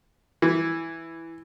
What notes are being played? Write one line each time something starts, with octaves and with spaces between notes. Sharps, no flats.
E3